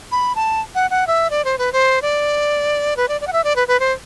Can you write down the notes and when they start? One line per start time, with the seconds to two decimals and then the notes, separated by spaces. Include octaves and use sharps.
0.12 B5
0.36 A5
0.75 F#5
0.90 F#5
1.07 E5
1.30 D5
1.45 C5
1.58 B4
1.72 C5
2.02 D5
2.97 B4
3.08 D5
3.21 D5
3.27 F#5
3.33 E5
3.44 D5
3.56 B4
3.68 B4
3.80 C5